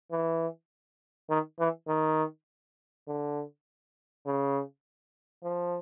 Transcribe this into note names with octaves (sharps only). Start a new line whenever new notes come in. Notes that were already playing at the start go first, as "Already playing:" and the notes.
E3
D#3
E3
D#3
D3
C#3
F3